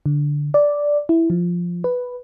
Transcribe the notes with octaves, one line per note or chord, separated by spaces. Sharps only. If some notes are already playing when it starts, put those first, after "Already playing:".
D3
D5
E4
F3
B4